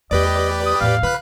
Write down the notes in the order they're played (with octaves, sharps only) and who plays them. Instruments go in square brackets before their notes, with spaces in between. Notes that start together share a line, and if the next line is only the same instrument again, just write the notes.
[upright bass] E2 A3 [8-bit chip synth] G4 B4 D5 [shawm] D#5
[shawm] D#6
[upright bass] E2 A2 [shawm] F5
[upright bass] C#3 F4 [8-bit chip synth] B4 B5 F#6